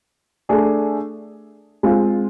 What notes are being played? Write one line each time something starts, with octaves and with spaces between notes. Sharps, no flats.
A3 D4 G#4
G#3 C4 F4